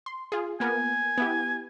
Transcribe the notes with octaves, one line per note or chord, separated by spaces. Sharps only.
C6
F4 G#4
A#3 B3 A#4 G#5
B3 E4 G4